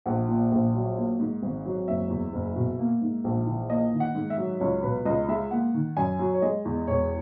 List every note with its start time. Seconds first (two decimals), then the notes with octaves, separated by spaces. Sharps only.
0.06 A#1 F#5
0.28 A#2
0.52 A#1
0.74 F#3
0.97 A#3
1.20 G#2
1.42 G#1
1.65 F#3
1.88 F#1 E5
2.10 E2
2.33 F#1
2.56 B2
2.79 A#3
3.02 G#2
3.24 A#1
3.47 E3
3.69 A#3 D#5
3.93 D#3
4.00 F#5
4.15 G#2
4.30 E5
4.37 F#3
4.60 C#2 C#5
4.83 B2 B4
5.05 C#2 D#5
5.28 G#3 E5
5.51 A#3 F#5
5.74 D#3
5.97 F#2 G#5
6.19 F#3
6.34 C#5
6.42 G#3 D#5
6.65 E2
6.88 E1 C#5